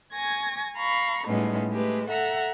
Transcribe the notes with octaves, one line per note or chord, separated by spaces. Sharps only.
G#5 C#6 G#6 A#6
F5 A#5 B5 C#6
A2 G3 G#3 B3 C#4 D#4
G#3 A3 G4 B4
A4 E5 F#5 A#5